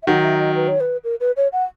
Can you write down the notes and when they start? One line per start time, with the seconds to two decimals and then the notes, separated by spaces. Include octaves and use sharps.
0.03 E5
0.07 D#3 F#3 F#5
0.23 E5
0.40 D#5
0.56 B4
0.68 C#5
0.80 B4
1.04 A#4
1.20 B4
1.36 C#5
1.52 F#5